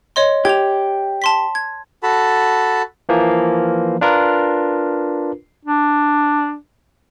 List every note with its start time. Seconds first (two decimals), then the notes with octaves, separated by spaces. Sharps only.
0.16 C#5 D#5 C6
0.45 G4 G#6 F7
1.22 A5 C6 B6
1.55 G#6
2.03 F#4 A4 A5 B5
3.09 E3 F3 A#3
4.01 D4 F4 A#4 B4
5.66 D4